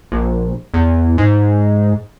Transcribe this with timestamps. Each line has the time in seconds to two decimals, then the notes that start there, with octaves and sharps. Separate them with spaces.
0.12 A#1
0.74 E2
1.18 G#2